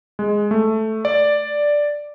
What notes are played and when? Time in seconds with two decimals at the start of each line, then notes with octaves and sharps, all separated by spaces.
0.19 G#3
0.51 A3
1.05 D5